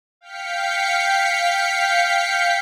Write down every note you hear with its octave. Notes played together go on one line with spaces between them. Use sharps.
F5 G5 B6 C#7